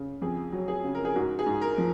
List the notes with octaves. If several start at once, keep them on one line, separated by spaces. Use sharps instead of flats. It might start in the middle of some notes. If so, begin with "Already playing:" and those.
Already playing: C#3
F2 G#4
F#3
G#4
C#3
A#4
G#4
G#2 F#4
G#4
G#2
A#4
F3